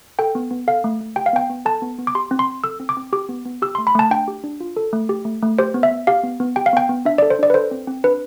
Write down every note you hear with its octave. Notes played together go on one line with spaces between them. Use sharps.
A4 G5
B3
B3
A4 F5
A3
A3
G4 G5
F5
B3 G5
B3
A4 A5
B3
B3
D6
G4 C6
C4
C6
C4
A4 E6
C4
D6
C4
G4 D6
B3
B3
G4 E6
C6
A3
B5
A3 A5
D4 G5
G4
D4
F4
A4
A3
G4
A3
A3
G4 C5
B3
E5
B3
G4 F5
B3
B3
G4 G5
F5
B3 G5
B3
D4 E5
D5
A4
C5
D4 D5
B4
A4 C5
C4
C4
D4 B4